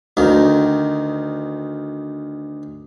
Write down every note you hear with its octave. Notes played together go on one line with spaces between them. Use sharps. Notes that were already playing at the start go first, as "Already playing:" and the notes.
D2 D#3